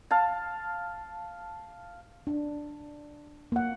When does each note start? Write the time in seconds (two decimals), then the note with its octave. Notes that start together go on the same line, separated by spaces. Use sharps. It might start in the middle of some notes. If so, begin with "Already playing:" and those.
0.11 F5 A5
2.27 D4
3.52 A#3 F#5